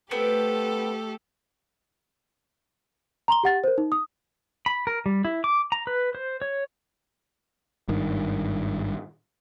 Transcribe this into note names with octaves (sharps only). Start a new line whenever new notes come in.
A3 B3 C4 G4 A4 B4
A#5 C6 G7
G4 F#5 A6
A#4 C5
D#4
D#6
B5
A#4
G3
E4
D6
A#5
B4
C5
C#5
G#1 G2 D#3